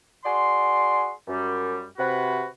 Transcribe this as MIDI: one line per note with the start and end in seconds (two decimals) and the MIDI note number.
0.24 1.11 66
0.24 1.11 68
0.24 1.11 74
0.24 1.11 84
1.28 1.84 42
1.28 1.84 55
1.98 2.45 48
1.98 2.45 66
1.98 2.45 71